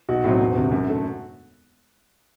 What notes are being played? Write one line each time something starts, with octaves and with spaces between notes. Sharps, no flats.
B1 F#4
A2 F#3 C4
E1
D2 C3
F#2
D3 A3